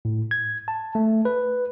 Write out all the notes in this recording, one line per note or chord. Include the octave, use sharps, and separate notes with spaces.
A2
G#6
A5
A3
B4